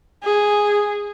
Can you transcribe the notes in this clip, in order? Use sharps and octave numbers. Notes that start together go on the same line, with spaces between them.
G#4